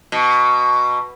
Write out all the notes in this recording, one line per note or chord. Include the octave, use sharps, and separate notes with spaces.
B2